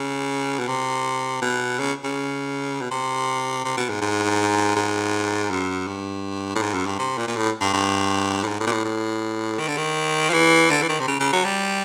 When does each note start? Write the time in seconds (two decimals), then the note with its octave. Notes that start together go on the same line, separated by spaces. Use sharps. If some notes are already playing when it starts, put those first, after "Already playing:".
Already playing: C#3
0.59 B2
0.68 C3
1.42 B2
1.79 C#3
2.04 C#3
2.81 B2
2.91 C3
3.65 C3
3.77 B2
3.89 G#2
4.02 G#2
4.76 G#2
5.51 F#2
5.87 G2
6.55 A2
6.62 G#2
6.74 F#2
6.86 G2
6.99 C3
7.18 A#2
7.28 A#2
7.36 A2
7.61 G2
7.73 G2
8.43 A2
8.47 G#2
8.60 A2
8.67 A#2
8.72 A2
8.85 A2
9.59 D#3
9.68 D3
9.77 D#3
10.29 F3
10.33 E3
10.70 D3
10.82 E3
10.89 D#3
11.00 C3
11.07 C#3
11.20 C#3
11.32 F#3
11.45 G3